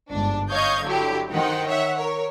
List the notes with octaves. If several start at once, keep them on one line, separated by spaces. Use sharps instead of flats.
G1 G#2 D4
C#5 D#5 F5 G6 G#6
D3 F#3 E4 G4
D#3 D#4 C5 F#5 G5
C#5 E5 F#5
A#4 C#5